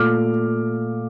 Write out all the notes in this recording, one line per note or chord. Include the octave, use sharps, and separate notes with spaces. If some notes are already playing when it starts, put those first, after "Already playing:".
Already playing: A#2 A3 D6 F6